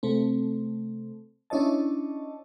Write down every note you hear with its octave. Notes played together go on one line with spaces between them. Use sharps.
C3 A3 C4
C#4 D4 E4 C#5 D#5 A5